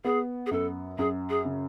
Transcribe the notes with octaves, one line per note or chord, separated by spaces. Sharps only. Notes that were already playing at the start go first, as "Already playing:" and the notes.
B3 G#4
G#4
F#2 A4
F#2 G#4
G#4
C#3